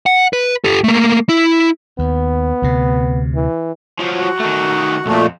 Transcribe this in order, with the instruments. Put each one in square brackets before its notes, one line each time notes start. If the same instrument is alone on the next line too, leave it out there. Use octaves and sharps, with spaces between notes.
[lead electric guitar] F#5
B4
G4 A4
A3 A#3
E4
[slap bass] D#2 [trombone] B3
[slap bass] D2 C3
[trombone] E3
[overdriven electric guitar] F3 F#3
[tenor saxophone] F#4
[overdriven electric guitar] D#3 A3
[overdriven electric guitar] B1 F2 [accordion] A#2 A3